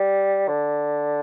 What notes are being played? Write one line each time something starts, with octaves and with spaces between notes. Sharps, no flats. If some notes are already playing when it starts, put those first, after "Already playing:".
Already playing: G3
D3